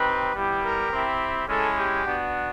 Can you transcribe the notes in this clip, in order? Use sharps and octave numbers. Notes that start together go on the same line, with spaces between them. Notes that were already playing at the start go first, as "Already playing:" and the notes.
Already playing: C4 D#4 G4 B4
G3 B3 E4 G4
A#4
C4 E4 G4
G#3 C#4 E4 A4
G4
B3 D4 F#4